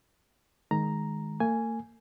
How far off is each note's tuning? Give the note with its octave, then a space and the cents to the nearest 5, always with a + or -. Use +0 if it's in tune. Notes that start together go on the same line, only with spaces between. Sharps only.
D#3 +0 G#3 +5 A#5 +0
A#3 -45 G#5 +0